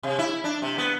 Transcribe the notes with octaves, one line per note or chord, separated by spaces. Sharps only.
C3
E4
D4
C3
B3